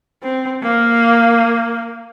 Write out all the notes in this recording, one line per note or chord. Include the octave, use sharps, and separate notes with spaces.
C4
A#3